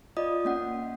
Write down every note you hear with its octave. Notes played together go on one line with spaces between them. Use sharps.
F4 D5 D#5 D#6
A#3 C#4 F#5